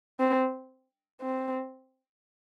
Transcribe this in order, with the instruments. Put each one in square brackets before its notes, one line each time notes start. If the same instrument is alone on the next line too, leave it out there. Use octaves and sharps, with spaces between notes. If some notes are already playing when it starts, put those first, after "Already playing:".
[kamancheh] C4
C4